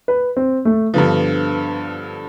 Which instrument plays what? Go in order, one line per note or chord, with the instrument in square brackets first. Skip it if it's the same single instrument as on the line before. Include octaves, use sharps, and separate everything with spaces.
[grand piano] B4
C4
A3
[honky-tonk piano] G2 D3 F3 [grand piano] B3